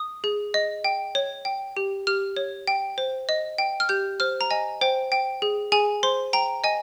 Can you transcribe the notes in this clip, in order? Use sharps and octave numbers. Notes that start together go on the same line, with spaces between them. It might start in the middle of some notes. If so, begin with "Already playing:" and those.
Already playing: D#6
G#4
D#5
G5
C#5
G5
G4
G4 F6
C#5
G5
C5
D#5
G5
F6
G4 G6
C5 F6
A#5
D#5 G#5
C5 G5
G5
G#4
G#4 G#5
C5 C6
G5 A#5
D#5 G#5